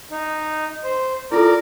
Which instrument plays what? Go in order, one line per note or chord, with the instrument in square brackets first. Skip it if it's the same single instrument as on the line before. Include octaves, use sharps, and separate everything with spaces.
[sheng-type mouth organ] D#4
C5
[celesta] E4 F4 A4 [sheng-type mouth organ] A#4 D5